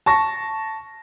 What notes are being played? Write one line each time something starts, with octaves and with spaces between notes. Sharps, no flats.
A5 C#6 A#6